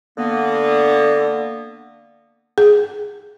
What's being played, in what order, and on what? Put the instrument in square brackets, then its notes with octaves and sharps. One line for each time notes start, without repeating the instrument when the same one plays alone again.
[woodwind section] D3 A#3 B3
[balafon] G#4